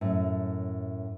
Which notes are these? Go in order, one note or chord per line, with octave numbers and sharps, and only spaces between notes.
F#2 A2